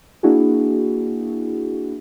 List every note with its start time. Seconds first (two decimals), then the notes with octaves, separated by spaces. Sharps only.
0.23 A#3 D4 E4 F#4 G#4